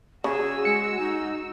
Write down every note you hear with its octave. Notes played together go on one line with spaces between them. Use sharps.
C#3 F#4 G#4 E6
G#3 C#7
D#4